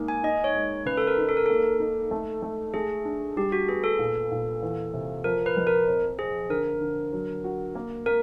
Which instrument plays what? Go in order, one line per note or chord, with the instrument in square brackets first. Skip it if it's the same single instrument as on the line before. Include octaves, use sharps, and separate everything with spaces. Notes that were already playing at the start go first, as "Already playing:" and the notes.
Already playing: [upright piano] G#2 G#3 A#3
[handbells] G#5
[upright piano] D#4 [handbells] D#5
[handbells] C#5
[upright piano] G#3
[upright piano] C#3 [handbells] B4
[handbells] A4
A#4
[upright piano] D#4
[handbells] A4
A#4
[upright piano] A#3 [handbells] A4
[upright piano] D#4
A3
A3
[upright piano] A3 [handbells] G#4
[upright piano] D4
[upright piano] G3 [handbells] G4
[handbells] F#4
[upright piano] B3 [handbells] G#4
[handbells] A4
[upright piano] A#2
A#2
E2
C3
[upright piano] F3 [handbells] A#4
[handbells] B4
[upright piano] F2
[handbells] A#4
[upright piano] C4
[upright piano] C4 [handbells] G#4
[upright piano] D3 [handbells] A#4
[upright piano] D3
F#3
F#4
A#3
[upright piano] A#3 [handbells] A#4